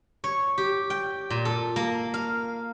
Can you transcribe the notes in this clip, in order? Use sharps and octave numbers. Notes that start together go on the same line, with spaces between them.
C#5
G4
G5
A#2
A4
A#3
F5